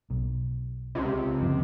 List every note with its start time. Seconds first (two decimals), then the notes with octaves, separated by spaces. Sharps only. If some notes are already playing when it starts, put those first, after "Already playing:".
0.10 B1
0.95 C#2 C3
1.41 F#1 D3 F3